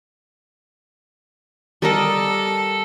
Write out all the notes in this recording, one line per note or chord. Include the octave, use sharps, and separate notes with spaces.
G3 A4 A#4 D#5